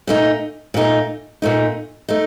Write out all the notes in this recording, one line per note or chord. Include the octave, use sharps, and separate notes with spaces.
A#2 A3 D#4
A#2 A3 D#4
A#2 A3 D#4
A3 D#4